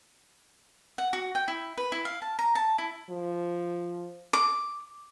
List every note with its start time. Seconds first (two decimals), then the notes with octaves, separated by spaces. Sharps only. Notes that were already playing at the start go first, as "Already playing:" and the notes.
0.98 F#5
1.13 F#4
1.35 G5
1.48 E4
1.77 B4
1.92 E4
2.05 F5
2.22 A5
2.39 A#5
2.55 A5
2.78 E4
3.10 F3
4.33 D6